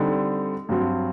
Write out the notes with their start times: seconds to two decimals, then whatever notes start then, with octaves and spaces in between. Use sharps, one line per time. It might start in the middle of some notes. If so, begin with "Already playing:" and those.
Already playing: D3 G3 C4 D#4
0.69 G2 F#3 C4 F#4